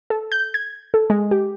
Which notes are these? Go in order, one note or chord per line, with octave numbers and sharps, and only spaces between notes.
A4
G6
G#6
A4
G#3
G4